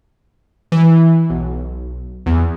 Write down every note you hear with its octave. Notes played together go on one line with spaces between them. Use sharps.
E3
B1
E2